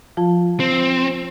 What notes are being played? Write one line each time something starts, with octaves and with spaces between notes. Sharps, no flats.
F3 F4 A5
C4